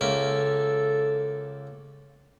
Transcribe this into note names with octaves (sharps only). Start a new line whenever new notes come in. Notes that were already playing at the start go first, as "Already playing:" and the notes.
C#2 A#3 A4 E5